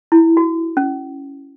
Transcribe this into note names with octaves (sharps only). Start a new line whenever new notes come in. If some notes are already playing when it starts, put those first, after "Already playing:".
E4
F#4
C#4